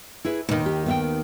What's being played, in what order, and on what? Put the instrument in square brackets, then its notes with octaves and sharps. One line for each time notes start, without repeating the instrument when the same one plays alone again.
[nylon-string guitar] E4 G#4 B4
[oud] D#2 D#3 [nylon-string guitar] B2
[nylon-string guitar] G4
B3 E5 G5